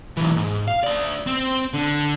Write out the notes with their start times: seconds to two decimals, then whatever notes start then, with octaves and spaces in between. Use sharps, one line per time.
0.17 B1 E3
0.37 G#2
0.68 F5
0.83 D2 D5
1.27 C4
1.74 D3